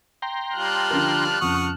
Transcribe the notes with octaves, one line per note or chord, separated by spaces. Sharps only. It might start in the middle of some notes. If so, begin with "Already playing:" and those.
G5 A#5 C6
G3 F4 A5 F6 F#6
D3 F3 A#4
F2 C#3 F#5 C#6 D#6